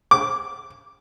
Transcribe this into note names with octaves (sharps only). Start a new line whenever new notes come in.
D6